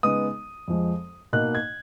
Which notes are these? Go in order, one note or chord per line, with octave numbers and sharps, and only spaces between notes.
C#3 G#3 B3 D#4 D#6
F2 F3 G#3
B2 A#3 D#4 F#6
G#6